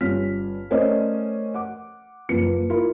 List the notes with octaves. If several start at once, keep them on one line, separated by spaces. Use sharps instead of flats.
G1 G2 C#4 F4 F6 B6
A3 C#4 A#4 C5 D5 D#5
F#5 D6
F#1 F3 A#3 B4 C#7
E4 F4 A#4